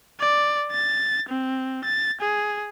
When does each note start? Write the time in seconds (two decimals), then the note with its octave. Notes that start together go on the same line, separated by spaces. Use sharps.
0.20 D5
0.71 A6
1.29 C4
1.84 A6
2.21 G#4